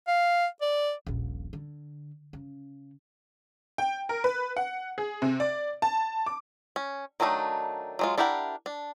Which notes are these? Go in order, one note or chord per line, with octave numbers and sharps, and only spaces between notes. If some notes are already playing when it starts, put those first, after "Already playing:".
F5
D5
D#1 A#1
D3
C#3
G5
A#4
B4
F#5
G#4
C3
D5
A5
D6
C#4
D#3 F#3 A3 D4 D#4
F#3 G#3 F4
D4 E4 G4 A#4 F#5
D4